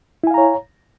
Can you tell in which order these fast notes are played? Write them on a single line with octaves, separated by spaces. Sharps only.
E4 G#5 F5 A#5 C#5